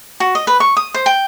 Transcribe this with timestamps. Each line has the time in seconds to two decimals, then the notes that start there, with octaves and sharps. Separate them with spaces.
0.20 F#4
0.35 D#5
0.47 B4
0.60 C#6
0.77 D#6
0.94 C5
1.06 G5